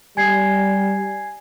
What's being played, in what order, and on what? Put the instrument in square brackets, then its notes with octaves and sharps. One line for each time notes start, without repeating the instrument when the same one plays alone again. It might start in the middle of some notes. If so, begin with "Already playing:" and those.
[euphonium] G3 [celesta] G#5 G#6 C7